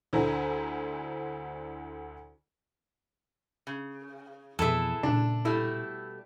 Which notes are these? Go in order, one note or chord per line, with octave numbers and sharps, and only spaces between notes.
D2 D3 E4 C5 G#5 A#5
C#3
F2 B2 E3 E4 G#4 A4 E5
A#2 C#3 D4
B2 G3 A3 E4